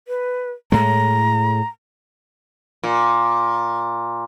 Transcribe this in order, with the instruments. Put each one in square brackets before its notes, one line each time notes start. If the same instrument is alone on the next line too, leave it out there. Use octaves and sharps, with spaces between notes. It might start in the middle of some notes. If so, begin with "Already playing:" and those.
[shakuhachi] B4
[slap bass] A2 G#3 [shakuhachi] A#5
[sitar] A#2